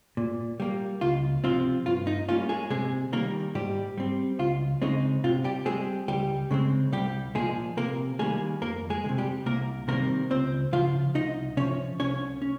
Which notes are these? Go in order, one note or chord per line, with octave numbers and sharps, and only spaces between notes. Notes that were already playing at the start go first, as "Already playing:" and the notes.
A#2
G3 A#3
C#2 F4
C3 F3 C4 F4
G2 F4
D#4
G3 A#3 C#4 F4
G#3 G#4
C3 G#3 G#4
D#3 G3 A#3 A#4
G#2 G3 G4
G3 C4
C#2 F4
C#3 G#3 C4 D#4
C3 F4
G3 G4
G3 G#3 C4 G#4
C#2 G3 G4
C#3 G#3 C4
C2 G3 G4
A#2 F3 G#3 G#4
C3 A#3 A#4
D#3 G3 G#3 A#3 G#4
F2 A#3 A#4
G#3 G#4
D#3 G#3
C3
G3 G4
C2 A#3 A#4
C3 D#3 G3 A#3 C4 A#4
C#2 C4 C5
C#3 F3 F4 F5
C2 D#4 D#5
C3 F3 C#4 C#5
C2 C#4 C#5
C#4